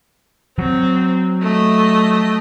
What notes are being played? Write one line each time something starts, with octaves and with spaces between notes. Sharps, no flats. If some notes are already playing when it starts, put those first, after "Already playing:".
F#3 C4
A3 D#5